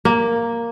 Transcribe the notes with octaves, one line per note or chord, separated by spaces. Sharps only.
A#3